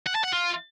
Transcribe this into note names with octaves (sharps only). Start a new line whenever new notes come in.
F#5
A5
F#5
F4